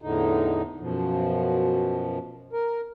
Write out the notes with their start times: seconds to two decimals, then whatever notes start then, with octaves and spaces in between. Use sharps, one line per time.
0.02 E2 A2 D3 D#4
0.80 F#2 B2 F3
2.53 A#4